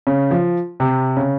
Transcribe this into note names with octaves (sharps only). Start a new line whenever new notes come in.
C#3
F3
C3
C#3